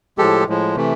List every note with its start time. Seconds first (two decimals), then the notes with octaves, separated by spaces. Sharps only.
0.18 A2 F3 G#3 G4 A4
0.47 A2 F3 G#3
0.75 C3 E3 A3